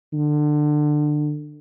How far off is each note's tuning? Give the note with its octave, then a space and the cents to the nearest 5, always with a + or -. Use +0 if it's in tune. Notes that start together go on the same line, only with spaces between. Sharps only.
D3 +25